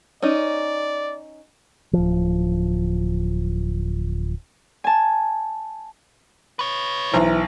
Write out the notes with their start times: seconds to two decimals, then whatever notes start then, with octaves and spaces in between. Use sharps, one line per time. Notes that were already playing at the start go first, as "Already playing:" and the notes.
0.22 C#4 D#4 D5
1.93 D1 F3
4.84 G#5 A5
6.59 B4 C#5
7.14 B1 E3 C5 A#5